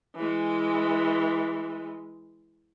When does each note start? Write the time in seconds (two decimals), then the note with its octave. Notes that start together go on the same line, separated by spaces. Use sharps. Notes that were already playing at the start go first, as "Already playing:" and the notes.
0.16 E3 G#3